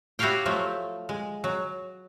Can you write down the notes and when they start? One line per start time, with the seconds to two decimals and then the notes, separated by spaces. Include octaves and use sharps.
0.19 E4 F#4 G4 C#5 F5 G5
0.46 F3 F#3 A3
1.09 G#3
1.44 F#3